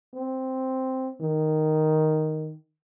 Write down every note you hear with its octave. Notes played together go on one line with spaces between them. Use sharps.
C4
D#3